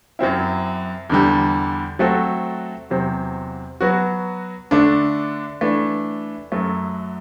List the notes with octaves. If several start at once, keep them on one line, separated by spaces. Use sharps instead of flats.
F#2 F#3 C4 E4
E2 D3 G3
F#3 A3 C4 F#4 A4
E2 C3 F#3 C4
F#3 B3 F#4
D3 A3 D4
E3 A3 D4
F#2 F#3 A3